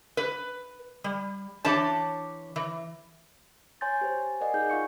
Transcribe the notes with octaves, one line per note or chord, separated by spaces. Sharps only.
B4
G3
E3 D4 G4 C#5 A5
E3
C#5 G#5 C6 G6 A6
G4 C5 G#5
A#4 D5 D#5 F#5 G#5
D#4 G#4 G6
F4 F5 C#6 C#7